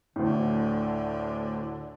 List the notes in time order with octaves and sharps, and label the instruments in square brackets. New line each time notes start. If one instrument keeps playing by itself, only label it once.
[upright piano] D2 A2 [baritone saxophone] D3